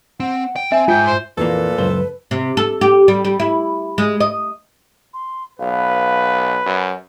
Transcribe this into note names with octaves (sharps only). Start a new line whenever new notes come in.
C4 F#5
G5
C4 E5 G#5
G#2 F4 G5
C5
F2 A#2 E3 A#3 A4 B4
C#2 F#2 C5
C3
A4
G4
G3
G3
E4
G#3
D#5
C6
B1 B4 F5
F#2